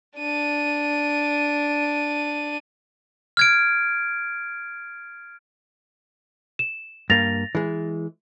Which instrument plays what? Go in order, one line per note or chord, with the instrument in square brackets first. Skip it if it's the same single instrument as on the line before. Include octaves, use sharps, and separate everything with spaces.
[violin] D4 D#7
[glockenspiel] F6 G#6 D7
[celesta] E7
[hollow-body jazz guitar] G2 A#3 [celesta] A6 A#6 F7
[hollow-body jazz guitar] E3 G#3